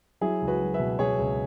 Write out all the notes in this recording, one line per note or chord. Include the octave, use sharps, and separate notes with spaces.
F#3 E4 G#4
C#2
F#4 B4
F#3
B4 E5
B2
B2 G#4 C#5
C#2